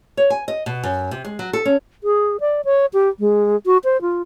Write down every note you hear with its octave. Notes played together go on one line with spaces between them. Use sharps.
C#5
G#5
D#5
B2
F#2
C3
G#3
F#3
A4
C#4
G#4
D5
C#5
G4
G#3
F#4
C5
F4